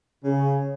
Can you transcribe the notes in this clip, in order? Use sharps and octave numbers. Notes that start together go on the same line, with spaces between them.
C#3